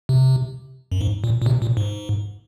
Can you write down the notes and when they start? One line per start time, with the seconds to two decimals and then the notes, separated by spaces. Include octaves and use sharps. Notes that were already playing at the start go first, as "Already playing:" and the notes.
0.09 C3
0.92 F#2
1.01 G#2
1.24 A#2
1.42 A#2
1.46 C3
1.62 A#2
1.77 G#2